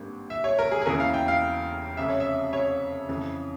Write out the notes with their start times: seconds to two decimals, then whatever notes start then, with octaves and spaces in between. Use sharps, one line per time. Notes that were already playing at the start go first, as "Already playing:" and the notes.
Already playing: G#1 G2 G3 A#3
0.30 E5
0.44 C#5
0.59 A#4
0.71 G#4
0.82 G#4
0.86 E1 E2 E3 A#3 C#4 A#4
1.00 F5
1.14 G5
1.28 F5
1.97 F1 F2 C#3 E5
2.08 C#5
2.20 E5
2.53 C#5
3.09 F2 C#3 E3